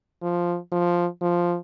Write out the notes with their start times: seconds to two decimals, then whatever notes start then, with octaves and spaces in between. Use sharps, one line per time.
0.22 F3
0.72 F3
1.21 F3